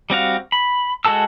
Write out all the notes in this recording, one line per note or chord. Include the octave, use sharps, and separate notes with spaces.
G3 C4 F#4 F5
B5
G#3 F#4 A4 A5 E6